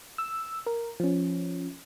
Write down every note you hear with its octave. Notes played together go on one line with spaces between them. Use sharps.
E6
A#4
F3 C#4